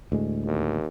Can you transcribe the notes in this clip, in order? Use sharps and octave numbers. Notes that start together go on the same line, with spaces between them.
D2 A2 G#3
D#2